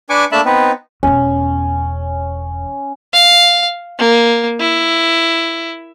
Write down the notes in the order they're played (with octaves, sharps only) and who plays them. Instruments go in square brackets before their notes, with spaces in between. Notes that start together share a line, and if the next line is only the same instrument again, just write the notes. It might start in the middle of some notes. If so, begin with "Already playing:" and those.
[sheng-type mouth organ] D4 B4 G#5 C#6 D6
A3 A#3 D4 E5 A5 B5
B3 C4 D#4 B4
[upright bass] E1 E2 [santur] C#4
[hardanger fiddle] F5
A#3
E4